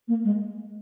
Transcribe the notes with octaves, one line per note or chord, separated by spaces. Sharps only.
A#3
G#3